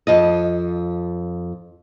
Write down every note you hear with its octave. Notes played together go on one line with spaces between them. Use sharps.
F2 F4 D#5